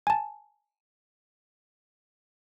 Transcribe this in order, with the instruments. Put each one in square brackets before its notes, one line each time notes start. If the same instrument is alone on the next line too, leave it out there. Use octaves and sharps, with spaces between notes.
[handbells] G#5 A5